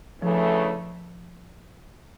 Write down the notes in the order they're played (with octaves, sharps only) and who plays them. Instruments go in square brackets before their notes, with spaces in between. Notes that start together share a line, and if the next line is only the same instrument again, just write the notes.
[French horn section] D2 C#3 E3 A3 [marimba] F3